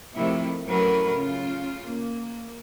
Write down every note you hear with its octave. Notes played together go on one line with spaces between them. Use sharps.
C3 D#3 F3 A3 E4
E3 F#3 A3 C#4 A#4 B4
C#3 F4
A#3